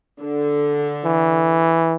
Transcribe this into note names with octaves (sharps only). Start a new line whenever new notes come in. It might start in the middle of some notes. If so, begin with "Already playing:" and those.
D3
E3